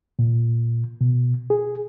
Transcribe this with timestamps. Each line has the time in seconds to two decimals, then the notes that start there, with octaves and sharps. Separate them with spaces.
0.19 A#2
1.01 B2
1.50 G#4